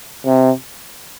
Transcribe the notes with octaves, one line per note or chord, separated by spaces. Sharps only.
C3